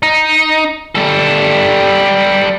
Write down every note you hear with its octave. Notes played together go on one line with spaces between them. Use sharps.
D#4
G3 A4